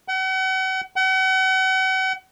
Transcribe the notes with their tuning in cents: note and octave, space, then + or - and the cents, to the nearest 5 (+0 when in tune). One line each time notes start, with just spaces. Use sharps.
F#5 +40
F#5 +40